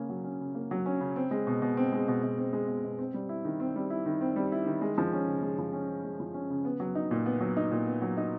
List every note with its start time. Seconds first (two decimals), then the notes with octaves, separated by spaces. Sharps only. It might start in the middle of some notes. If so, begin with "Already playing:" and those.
Already playing: C#3 A#3 C#4
0.09 F#3
0.24 C#4
0.41 C#3
0.55 A#3
0.71 F#3
0.86 C#4
1.00 C#3
1.16 C4
1.31 G#3
1.47 B2
1.62 B2
1.77 C4
1.92 G#3
2.08 B2
2.23 B2
2.38 C4
2.53 G#3
2.68 B2
2.84 B2
2.99 C4
3.14 G3
3.29 E4
3.45 D#3
3.60 C4
3.76 G3
3.90 E4
4.06 D#3
4.21 C4
4.36 G3
4.52 E4
4.66 D#3
4.81 G#3
4.98 F3
5.13 C#4
5.28 C#3
5.42 G#3
5.58 F3
5.73 C#4
5.89 C#3
6.04 G#3
6.20 F3
6.34 C#4
6.50 C#3
6.65 B3
6.80 F#3
6.95 D#4
7.11 A#2
7.26 B3
7.40 F#3
7.57 D#4
7.71 A#2
7.87 B3
8.02 F#3
8.17 D#4